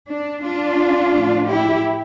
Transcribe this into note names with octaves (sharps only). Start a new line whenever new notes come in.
D4
D4 F4
A2 F3 A3
E4 G4